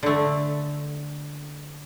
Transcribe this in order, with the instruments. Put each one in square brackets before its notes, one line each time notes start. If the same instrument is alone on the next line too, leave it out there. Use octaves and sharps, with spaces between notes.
[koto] D3 A3